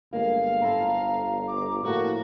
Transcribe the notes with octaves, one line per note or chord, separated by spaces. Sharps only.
G1 G#3 A#3 F5
C4 E4 A4 A#5
D6
A2 F3 A#3 F#4